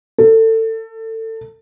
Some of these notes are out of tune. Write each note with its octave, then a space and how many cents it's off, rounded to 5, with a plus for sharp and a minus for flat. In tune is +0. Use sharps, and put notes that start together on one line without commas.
A4 +25